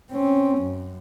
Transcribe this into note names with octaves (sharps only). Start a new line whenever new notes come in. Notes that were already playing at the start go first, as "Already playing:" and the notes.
C4 C#4
F#2